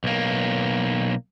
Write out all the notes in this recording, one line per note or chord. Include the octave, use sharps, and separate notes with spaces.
B1 A#3